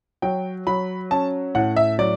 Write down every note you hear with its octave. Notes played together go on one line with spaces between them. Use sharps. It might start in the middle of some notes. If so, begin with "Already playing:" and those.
F#3 G5
F#3 B5
C#4 A5
A2 F#5
E5
F#3 D5